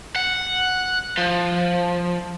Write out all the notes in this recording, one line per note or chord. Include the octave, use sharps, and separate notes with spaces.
F#5
F3